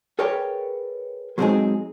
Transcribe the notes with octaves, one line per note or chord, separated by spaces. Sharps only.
G#4 A#4 B4 C#5 D5 G5
F#3 G#3 A3 C4 D#4 G#4